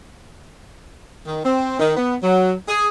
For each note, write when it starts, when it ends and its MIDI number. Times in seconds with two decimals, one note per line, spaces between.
1.26 1.44 51
1.44 1.78 60
1.80 1.94 51
1.97 2.16 59
2.23 2.54 54
2.68 2.89 68